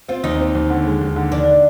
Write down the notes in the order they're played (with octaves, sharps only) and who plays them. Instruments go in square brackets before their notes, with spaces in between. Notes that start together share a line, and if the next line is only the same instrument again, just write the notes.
[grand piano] C4 [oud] F4
[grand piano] D#2 [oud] D#4
[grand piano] C4
D#2
D3
G#3
D#2
D3
[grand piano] D#2 [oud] D4